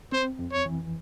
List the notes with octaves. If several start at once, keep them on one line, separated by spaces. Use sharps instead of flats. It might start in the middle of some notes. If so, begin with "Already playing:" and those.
C4 C5
F2
C#5
E3